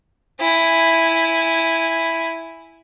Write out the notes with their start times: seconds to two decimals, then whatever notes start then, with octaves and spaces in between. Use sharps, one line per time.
0.40 E4 G#5